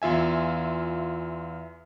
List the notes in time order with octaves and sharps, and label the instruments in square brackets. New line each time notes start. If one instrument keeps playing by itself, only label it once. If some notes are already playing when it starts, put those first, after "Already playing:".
[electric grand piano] E2 F4 E5 G#5